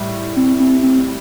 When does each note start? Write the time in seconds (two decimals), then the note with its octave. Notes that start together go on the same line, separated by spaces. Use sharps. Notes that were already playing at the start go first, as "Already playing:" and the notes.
Already playing: A2 G3
0.37 C4
0.60 C4
0.83 C4